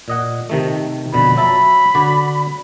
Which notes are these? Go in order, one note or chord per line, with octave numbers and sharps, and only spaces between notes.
A#2 D#5 F#5
C3 D#3 A3
F2 B2 D3 B5
F#3 E5 A5 B5
D3 F#4 D5